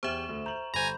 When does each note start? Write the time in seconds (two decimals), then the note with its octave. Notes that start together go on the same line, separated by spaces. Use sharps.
0.03 E2 G4 C5 E5 C#6 F6 E7
0.29 D2
0.46 A#5 G6 F#7
0.74 G1 C5 G#5 A#5 B5 G6 F7